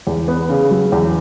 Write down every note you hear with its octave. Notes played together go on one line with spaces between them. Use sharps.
E2
B3
C#3
F#3
E2